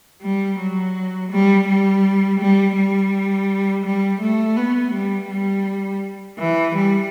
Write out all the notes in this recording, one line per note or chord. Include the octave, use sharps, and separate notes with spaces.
G3
F#3
G3
G3
G3
G3
G3
A3
B3
G3
G3
E3
G3